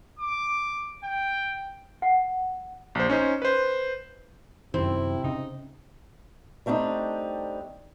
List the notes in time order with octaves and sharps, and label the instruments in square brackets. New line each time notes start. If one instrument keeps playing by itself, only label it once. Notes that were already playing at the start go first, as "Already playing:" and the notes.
[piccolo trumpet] D6
G5
[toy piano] F#5
[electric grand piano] A#1 C5
C#4 D#4 C5
B4 C5
[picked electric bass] F#2 D#3 [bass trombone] C3 [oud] C4 [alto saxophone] E4
[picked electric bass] C#3 [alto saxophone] D#4
[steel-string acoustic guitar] G3 A3 C4 D4 D#4